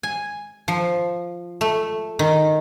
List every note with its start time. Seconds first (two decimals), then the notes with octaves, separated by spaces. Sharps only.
0.03 G#5
0.68 F3
1.61 A3
2.19 D#3